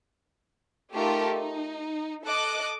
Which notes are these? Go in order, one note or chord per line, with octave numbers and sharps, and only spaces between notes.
A3 D#4 F4 G4 A4 A#4
D#4
A4 D#5 D6 F#6